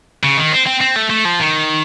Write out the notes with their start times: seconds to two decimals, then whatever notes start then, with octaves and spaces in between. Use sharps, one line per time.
0.23 C#3
0.37 D#3
0.52 C4
0.67 C4
0.81 C4
0.96 A3
1.10 A3
1.25 F3
1.40 D#3